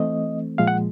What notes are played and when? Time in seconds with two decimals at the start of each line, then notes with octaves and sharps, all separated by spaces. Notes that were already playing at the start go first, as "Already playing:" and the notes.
Already playing: E3 A3 C4 D#5
0.58 A#2 F3 G#3 F5
0.68 F#5